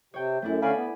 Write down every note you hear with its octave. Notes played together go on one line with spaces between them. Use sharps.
C3 C#5 G5
F#2 A3 D4 E4
D3 C#4 D5 F5 G#5 B5
B3